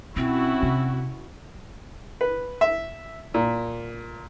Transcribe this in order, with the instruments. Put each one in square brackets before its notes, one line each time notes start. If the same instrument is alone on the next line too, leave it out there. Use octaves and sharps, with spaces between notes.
[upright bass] B2 [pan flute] C4 [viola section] C#4 E4 F#4
[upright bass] C3
[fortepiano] B4
E5
A#2